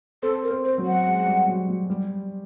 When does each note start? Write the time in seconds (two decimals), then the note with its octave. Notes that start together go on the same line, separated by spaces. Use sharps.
0.23 C4 A4
0.43 A#4
0.51 C4
0.64 C5
0.78 F#3
0.85 F#5
1.06 G#3
1.27 G3
1.48 F#3
1.68 F#3
1.90 G3